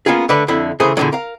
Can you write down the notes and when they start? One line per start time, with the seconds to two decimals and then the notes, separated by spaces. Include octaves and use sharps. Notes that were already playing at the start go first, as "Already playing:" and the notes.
0.06 A#3 B3 C#4 F4 G#4
0.29 D3 A3 B4 D5
0.48 F2 D3 E4 E5
0.80 C#3 E3 A3 G#4 A#4 C5
0.97 E2 A#2 D3 D#3 F#3
1.13 A#4 F5